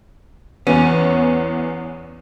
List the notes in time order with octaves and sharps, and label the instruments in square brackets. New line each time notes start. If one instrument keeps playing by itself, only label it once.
[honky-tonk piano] E2 E3 B3 [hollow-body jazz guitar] C#4